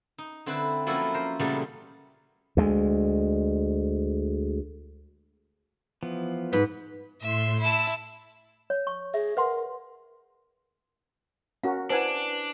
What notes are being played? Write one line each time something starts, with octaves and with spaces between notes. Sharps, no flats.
D#4
D3 C4 E4 B4
F3 F#3 A#3 C#4 E4 A4
A#4 C5
A#2 C#3 E3 F#3 G3 A3
D2 G#3
E3 F3 B3
G#2 B4
A2 E5 C6
E4 E5 A5
C#5
C#6
G#4 E5
A#4 B4 F#5 C6
C#4 F#4 A#4 F5
D4 E4 B4 C5 F#5 G#5 A5